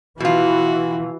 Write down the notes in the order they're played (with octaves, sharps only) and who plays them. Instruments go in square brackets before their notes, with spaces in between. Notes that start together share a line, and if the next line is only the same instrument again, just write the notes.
[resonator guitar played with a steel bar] B2 F4 [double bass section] E3 [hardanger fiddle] F#4